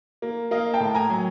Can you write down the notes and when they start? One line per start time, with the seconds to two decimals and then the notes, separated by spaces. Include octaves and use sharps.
0.22 A#3
0.51 A#3 D#5 F5
0.73 G5 A5
0.80 A2
0.95 G#5 A#5
1.10 F#3